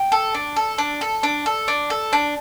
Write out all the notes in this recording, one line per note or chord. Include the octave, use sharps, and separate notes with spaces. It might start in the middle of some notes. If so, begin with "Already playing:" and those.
Already playing: G5
A4
D4
A4
D4
A4
D4
A4
D4
A4
D4